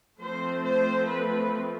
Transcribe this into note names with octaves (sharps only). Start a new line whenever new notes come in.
F3 A3 C4 C5
C5
B4